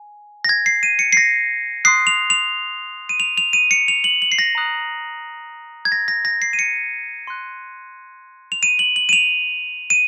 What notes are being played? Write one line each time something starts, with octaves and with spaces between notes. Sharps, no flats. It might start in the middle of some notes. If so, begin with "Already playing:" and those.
Already playing: G#5
A#6
G#6
C7
D#7
C#7
C7
A#6
C6 D#6 F#6 C7
F7
F7
D#7
F7
F7
D#7
C#7
F7
F#7
F#7
C7
A#6
A#5 D#6 F#6
G#6
A#6
A#6
A#6
C7
D#7
C#7
C6 F#6
F7
D#7
F#7
F#7
D#7
F7
D#7